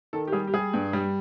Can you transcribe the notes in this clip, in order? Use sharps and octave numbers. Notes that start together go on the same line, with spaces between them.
D#3 A4
G4
G3 G#4
G4
G3 G#4
G2
G3